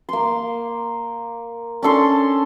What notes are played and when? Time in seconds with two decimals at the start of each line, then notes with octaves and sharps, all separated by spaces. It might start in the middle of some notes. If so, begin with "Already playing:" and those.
0.09 A#3 C6
1.82 C#4 D4 A4 C6